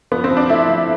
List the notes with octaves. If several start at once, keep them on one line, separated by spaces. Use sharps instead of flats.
F3 B3
C4
F3
D4
A3 E4
F3